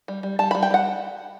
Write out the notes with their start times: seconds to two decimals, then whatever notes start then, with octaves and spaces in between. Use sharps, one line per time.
0.08 G3
0.23 G3
0.39 G3 A5
0.51 G3 B5
0.63 G5
0.70 G3 F#5